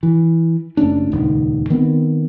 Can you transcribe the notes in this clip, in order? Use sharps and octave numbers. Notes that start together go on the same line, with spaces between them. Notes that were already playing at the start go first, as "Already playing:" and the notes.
E3
F#1 A3 C#4 D4
D#1 C#2 D#3
D#3 B3 C4